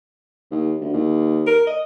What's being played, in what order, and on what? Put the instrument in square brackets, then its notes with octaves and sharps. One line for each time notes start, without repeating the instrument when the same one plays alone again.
[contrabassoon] D#2
D2
D#2
[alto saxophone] A#4
D#5